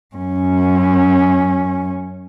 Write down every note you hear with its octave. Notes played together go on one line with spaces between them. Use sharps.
F#2 C#4